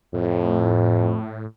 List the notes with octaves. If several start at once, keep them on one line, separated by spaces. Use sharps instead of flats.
F2 A2